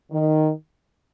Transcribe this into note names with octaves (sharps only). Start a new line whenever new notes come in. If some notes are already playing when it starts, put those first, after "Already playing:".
D#3